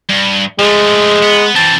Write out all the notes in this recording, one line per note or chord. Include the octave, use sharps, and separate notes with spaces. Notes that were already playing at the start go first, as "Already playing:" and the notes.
G2
F3 G#3 A3
B3
E3 C4 A5